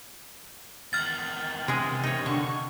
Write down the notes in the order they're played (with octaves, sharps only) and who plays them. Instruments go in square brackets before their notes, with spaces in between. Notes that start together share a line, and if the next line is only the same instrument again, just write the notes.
[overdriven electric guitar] E2 D#3 [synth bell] F6 A6
[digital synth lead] C3 [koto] G#3 G#4
[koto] D#4 C#5
[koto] D3 [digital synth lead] C#6